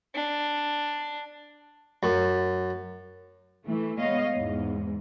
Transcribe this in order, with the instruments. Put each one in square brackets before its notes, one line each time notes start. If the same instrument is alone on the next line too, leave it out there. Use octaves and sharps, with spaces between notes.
[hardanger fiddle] D4
[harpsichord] F#2
[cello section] E3 A3
G#3 B3 C#5 D#5 F5
E2 G#2